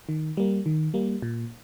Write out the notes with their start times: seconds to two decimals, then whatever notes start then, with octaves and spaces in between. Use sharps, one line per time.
0.09 D#3
0.37 G3 A#3
0.66 D#3
0.94 G3 A#3
1.22 A#2